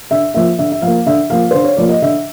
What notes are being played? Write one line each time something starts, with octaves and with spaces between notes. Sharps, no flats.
D3 E5
F3 A#3 E5
D3 E5
E5
F3 A#3 F5
D3 E5
F3 A#3 F5
D3 C5
C#5
F3 A#3 D5
D#5
D3 E5